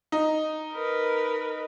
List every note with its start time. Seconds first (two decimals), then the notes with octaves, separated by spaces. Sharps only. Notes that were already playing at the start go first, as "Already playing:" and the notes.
0.12 D#4
0.73 A#4 B4